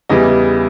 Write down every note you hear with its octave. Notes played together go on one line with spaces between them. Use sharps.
E2 C#3 E3 G3 D#5